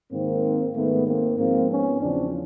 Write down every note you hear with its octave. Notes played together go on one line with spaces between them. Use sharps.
G#2 D#3 A#3 C4
G#2 D#3 A3 B3
A#3 C4
G#2 F3 A#3 C4
B3 C#4
E2 C#3 F3 C4 D4